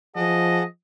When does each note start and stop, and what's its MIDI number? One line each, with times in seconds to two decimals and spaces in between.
0.16 0.64 53
0.16 0.63 68
0.16 0.62 75
0.16 0.63 78
0.16 0.63 81